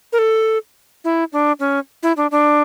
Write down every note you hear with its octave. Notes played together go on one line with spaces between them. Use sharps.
A#4
A4
E4
D4
C#4
E4
D4
D4